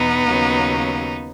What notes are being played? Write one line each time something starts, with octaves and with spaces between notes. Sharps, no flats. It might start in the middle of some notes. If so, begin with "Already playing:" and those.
Already playing: E2 B2 B3 D#4
D#2 C#3 F#3